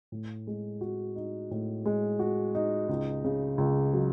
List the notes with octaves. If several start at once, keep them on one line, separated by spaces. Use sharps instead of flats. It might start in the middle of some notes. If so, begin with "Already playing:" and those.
A2
G#3
F#4
D#4
A2
G#3
F#4
D#4
C#2
C#3
C#2
F#3